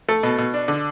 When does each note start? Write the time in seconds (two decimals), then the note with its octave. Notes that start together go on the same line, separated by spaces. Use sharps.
0.08 A3 A4
0.23 B2
0.38 B2
0.54 D4
0.68 D3